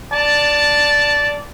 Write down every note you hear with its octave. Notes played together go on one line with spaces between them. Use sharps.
D5 A5